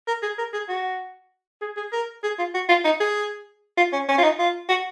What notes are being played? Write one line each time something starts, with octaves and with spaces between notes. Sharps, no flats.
A#4
G#4
A#4
G#4
F#4
G#4
G#4
A#4
G#4
F4
F#4
F4
D#4
G#4
F4
C#4
C#4
F4
D#4
F4
F#4